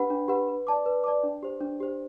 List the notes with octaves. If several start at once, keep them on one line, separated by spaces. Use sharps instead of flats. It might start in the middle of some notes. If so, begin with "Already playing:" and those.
Already playing: D4 G4 B4 F#5 B5
D4
G4 B4 F#5 B5
B4
D5 A5 D6
B4
D5 A5 D6
D4
G4 C5
D4
G4 C5